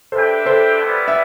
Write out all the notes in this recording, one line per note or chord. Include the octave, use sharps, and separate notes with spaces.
D4 G4 A4 B4 C5 E5 G5
A4 C5
G3 B3 E4 B4 D5
E5